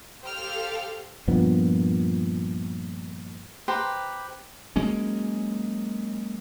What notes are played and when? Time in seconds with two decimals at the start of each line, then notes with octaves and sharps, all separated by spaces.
0.21 G4 A4 C5 F5 G5 F6
1.28 G2 A#2 F3 B3
3.68 G4 B4 C5 A#5
4.76 F#3 G#3 A#3 C#4